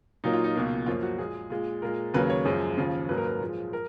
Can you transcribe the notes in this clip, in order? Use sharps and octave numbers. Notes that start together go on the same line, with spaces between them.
A#2 F#3 A#3 D#4
F4
D#4
C#2 B2 A#3
F#2 F3 A#3 F4
F#4
A#2 G#3 G#4
A#2 G#3
A#2 G#3 A#4
D#2 C#3 F#3 A#3 B4
C#5
F#2 F3 G#3
D#2 C#3 F3
G#2 F#3 A#3 B4
A#4
B4
A#2 F3 G#3
A#4